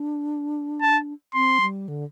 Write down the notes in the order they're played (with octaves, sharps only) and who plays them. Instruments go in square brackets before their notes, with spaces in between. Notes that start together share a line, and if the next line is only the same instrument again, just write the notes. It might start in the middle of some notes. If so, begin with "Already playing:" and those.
Already playing: [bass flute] D4
[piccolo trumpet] A5
[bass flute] C4 [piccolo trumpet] C6
[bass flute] G3
D3